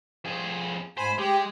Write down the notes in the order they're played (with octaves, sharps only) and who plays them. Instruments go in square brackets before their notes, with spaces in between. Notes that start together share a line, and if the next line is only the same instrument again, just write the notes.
[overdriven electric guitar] F2 G#4
[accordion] G#2 G#5 B5 [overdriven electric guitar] C5
[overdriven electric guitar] G#3 [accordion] G4